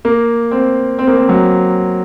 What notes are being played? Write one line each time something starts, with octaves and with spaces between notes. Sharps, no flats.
A#3
C4
C4
A#3
C4
F#3